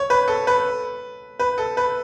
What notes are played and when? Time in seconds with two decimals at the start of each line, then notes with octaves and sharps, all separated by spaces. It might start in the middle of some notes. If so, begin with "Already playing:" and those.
Already playing: C#5
0.10 B4
0.28 A4
0.47 B4
1.39 B4
1.58 A4
1.77 B4